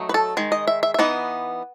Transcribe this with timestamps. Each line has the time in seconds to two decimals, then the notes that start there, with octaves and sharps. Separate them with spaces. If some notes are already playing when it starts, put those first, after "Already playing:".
Already playing: F#3 A3 D#4
0.09 B4
0.14 A4
0.37 D#3 G#3
0.52 D#5
0.67 E5
0.83 E5
0.94 E5
0.99 E3 B3 D#4 F#5